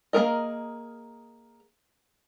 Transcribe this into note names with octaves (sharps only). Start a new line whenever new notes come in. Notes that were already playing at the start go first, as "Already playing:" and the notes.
A#3 D4 G#4 A#4 D#5